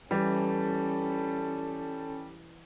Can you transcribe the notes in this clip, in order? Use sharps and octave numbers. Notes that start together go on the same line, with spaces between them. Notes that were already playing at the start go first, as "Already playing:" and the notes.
E3 G3 C#4 A4